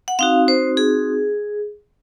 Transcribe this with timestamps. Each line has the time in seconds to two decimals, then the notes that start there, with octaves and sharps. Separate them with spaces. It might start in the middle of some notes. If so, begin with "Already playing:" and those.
0.08 F#5
0.19 C4 D#4 F#4 F5
0.48 C5
0.77 G#4